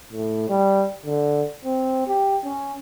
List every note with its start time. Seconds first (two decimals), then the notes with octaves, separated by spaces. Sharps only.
0.13 A2
0.50 G3
1.05 D3
1.65 C4
2.08 G4
2.45 C#4